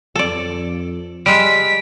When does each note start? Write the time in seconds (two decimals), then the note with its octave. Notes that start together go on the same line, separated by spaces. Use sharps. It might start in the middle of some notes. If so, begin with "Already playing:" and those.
0.15 F2 A4 D5
1.26 G3 G#3 B6 D7